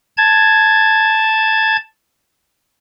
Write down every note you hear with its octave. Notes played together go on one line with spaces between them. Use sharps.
A5 G#6